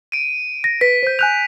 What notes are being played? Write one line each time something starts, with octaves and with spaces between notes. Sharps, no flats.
D7 D#7
A#6
B4 B6
C5 G6
G#5 F#6 G6 F7